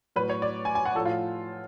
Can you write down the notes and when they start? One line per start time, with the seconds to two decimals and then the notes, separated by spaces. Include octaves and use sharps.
0.16 A2 F#3 B4
0.30 C#5
0.42 D5
0.65 G#5
0.75 G#5
0.85 F#5
0.95 F3 A4
0.99 A2
1.05 F4